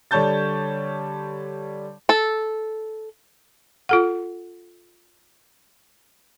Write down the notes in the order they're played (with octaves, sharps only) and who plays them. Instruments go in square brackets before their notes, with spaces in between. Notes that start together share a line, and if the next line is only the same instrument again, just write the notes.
[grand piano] D3 G3 C#5 A5 G6 A6
[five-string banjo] A4
[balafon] F4 A4 F#5